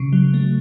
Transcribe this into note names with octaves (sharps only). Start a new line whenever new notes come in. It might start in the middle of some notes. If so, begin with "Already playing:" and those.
Already playing: C#3
F#3
A3